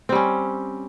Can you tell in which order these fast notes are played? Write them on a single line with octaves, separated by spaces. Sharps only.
C4 G3 C#4